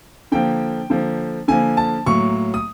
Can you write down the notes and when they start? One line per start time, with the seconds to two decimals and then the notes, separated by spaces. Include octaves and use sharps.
0.32 D3 F3 A#3 G5
0.90 D3 F3 A#3
1.48 D3 F3 A#3 G#5
1.77 A5
2.06 A2 F#3 A#3 C#6
2.54 D#6